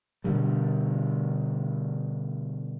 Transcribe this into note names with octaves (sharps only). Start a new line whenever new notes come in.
B2 D3 G3